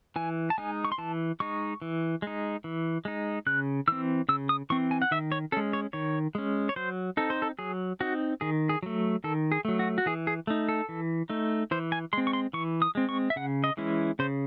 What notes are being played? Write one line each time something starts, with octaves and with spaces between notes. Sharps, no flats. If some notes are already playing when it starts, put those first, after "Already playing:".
E3 G#5
A5
G#3 D#4 G#5
C#6
C6
E3 A5
G#3 D#4 C#6
E3
G#3 D#4
E3
G#3 D#4
C#3 F#6
E3 C4 E6
C#3 E6
D#6
E3 C4 C#6
G#5
F#5
D#3 E5
C#5
G#3 C#4 A4
C#5
D#3 C#5
G#3 C#4
C#5
F#3 C5
C4 D#4 A4
C5
A4
F#3 G#4
C4 D#4 F#4
D#3 G#4
G#4
F#3 A3
D#3 A4
G#4
F#3 A3
F#4
F#4
E3 G#4
G#4
A3 D#4
A4
E3
A3 D#4
E3 C5
G#5
G#3 C4 C6
C#6
C6
E3 C#6
D#6
G#3 C4
C#6
E5
C#3 F#5
D#5
E3 G#3 C#4 E4
C#3 C5